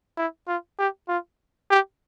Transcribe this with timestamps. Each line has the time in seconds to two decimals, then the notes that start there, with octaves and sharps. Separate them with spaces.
0.18 E4
0.48 F4
0.79 G4
1.08 F4
1.70 G4